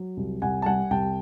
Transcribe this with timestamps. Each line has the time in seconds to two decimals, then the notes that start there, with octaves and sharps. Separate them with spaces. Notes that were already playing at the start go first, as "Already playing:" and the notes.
Already playing: F#3
0.17 C2
0.42 C2 F#5 G#5
0.62 A5
0.66 G3 F#5 G#5
0.91 C2 G5 A5